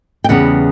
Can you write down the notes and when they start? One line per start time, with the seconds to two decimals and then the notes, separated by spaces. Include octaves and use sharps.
0.24 G5
0.29 E2 C#3 G3 B3 F#5